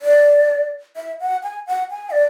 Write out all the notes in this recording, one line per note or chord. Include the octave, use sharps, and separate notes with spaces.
D5
E5
F#5
G#5
F#5
G#5
D5